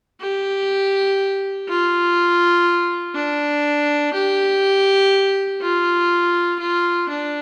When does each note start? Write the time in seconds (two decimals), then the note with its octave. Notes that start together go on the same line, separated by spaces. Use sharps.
0.21 G4
1.68 F4
3.15 D4
4.14 G4
5.61 F4
6.59 F4
7.09 D4